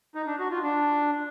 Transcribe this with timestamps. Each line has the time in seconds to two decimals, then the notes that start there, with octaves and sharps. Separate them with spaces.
0.15 D#4
0.27 D4
0.39 F#4
0.51 F4
0.63 D4